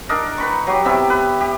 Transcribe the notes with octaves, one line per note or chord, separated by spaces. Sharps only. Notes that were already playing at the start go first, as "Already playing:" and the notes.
D4 D#4 A#4
B4 B5 C#6
F#3 G4
C3 B3 G4 E5
B4
G4